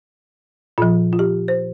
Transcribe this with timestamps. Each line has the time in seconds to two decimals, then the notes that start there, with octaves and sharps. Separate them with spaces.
0.78 A#2 F3 F4
1.13 F4
1.19 G4
1.48 C5